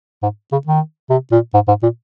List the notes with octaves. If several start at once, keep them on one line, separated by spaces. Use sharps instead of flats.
G#2
C#3
D#3
C3
A#2
G#2
G#2
A#2